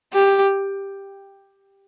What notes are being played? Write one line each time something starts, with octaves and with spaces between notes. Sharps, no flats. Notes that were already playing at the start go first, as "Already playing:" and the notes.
G4